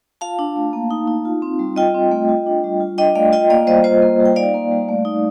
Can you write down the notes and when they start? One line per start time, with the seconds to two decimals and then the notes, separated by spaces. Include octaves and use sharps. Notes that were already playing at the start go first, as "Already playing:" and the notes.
0.21 F4 F5 A5
0.39 D4
0.56 A3
0.73 A#3
0.91 D#4
1.08 D#4
1.25 F4
1.42 C4
1.59 G3
1.76 F4 D#5 G5
1.94 C4
2.12 A3
2.29 F4
2.46 D4
2.64 G3
2.80 F4
2.98 D4 D#5 G5
3.15 A3 D5 F5
3.32 F4 D#5 G5
3.50 A#3 D5 F5
3.67 G3 C5 D#5
3.84 F4 C5 D#5
4.02 A#3
4.20 G3
4.26 G5
4.36 D#4 D5 F5
4.54 A#3
4.72 G3
4.89 A3
5.05 D#4